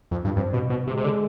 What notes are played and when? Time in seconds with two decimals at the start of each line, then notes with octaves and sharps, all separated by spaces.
0.11 F2
0.25 G2
0.36 G2 C4
0.53 B2
0.70 B2
0.87 C3 G#3
0.97 C3
1.04 D3